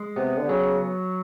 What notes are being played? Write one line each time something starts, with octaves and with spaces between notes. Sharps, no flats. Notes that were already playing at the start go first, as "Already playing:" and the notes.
Already playing: G#3
C3 B3
D3
C#3 F#3